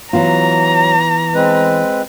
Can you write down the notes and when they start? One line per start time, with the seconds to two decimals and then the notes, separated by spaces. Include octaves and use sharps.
0.13 E3 F#3 B3 F4 A#5
1.35 G#3 C4 B4